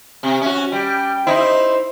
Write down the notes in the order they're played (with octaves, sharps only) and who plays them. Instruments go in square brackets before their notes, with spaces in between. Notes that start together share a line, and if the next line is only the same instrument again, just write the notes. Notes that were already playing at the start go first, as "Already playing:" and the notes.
[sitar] C3
C#4 F#4
[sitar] G3 [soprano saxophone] G5
[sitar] D#4 E4 [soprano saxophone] C5